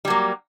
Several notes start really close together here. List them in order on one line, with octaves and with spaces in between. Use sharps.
G3 F#3 A#3